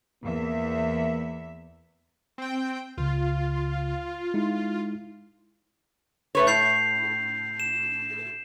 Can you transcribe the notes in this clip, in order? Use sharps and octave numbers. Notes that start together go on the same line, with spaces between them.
E2 A#3 E5
C4 G5
C#2 C#3 F4
G#3 D#4 E4
A3 B4 C#5
A2 G6 C7 F7
E7